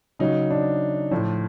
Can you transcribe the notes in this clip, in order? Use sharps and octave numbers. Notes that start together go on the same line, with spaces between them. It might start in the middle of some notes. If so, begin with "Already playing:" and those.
C#3 F#3 D#4
D4
A2 F3